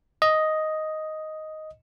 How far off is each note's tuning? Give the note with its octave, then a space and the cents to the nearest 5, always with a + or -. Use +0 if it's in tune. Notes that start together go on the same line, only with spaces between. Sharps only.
D#5 +5